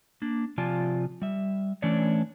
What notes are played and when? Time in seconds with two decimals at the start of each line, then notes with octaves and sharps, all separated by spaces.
0.22 A#3 D4
0.58 C3 F3 F4 D5 G#5 A5
1.22 G3 E5
1.82 E3 A3 C#4 D4 C#5 D5